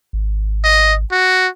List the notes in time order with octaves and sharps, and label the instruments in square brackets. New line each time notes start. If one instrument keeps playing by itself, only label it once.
[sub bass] G#1
[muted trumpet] D#5
F#4